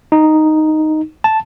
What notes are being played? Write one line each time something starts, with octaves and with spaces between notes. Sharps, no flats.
D#4
A5